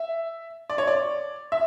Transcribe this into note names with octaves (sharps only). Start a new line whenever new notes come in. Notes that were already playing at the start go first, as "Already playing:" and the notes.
Already playing: E5
D5
C#5
D5
E5